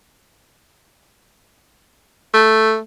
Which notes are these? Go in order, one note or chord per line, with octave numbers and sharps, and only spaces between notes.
A3